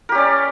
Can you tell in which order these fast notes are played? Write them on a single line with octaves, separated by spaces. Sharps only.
A#4 G4 C#4 D5